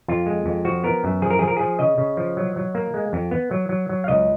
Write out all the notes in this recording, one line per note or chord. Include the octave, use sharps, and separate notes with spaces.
F2 F4
G#3
F2
F3 F#4
B3 A#4
F#2
F3 G#4
A#4
F3 G#4
A#4
F3 G#4
C#3 D#5
C#3
F3
F#3
F#3
A#3
G#3
F2
B3
F#3
F#3
F#3
F5
C#2 D#5